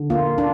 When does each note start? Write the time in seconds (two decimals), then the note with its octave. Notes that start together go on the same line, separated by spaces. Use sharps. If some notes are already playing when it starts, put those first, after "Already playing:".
Already playing: D3
0.10 A#3 F4
0.38 D4